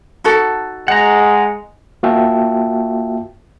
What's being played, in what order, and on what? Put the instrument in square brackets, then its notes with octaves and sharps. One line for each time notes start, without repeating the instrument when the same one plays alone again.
[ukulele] D#4 F#4 A4
[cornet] G#3 [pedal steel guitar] F#5 A#5
[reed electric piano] A#3 F4 F#4 E5 G5 A5